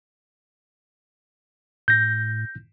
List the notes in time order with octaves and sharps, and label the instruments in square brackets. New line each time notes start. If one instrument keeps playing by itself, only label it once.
[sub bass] A2 [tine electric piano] G6 A#6